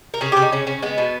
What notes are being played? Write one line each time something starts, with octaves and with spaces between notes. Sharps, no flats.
A#4
C#3 G#4
C#3 G4
D#4
C#3 C#4
C#3 C#4
G#3 B3
B2